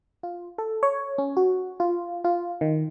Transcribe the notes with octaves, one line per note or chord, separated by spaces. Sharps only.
F4
A4
C#5
C#4
F#4
F4
F4
D#3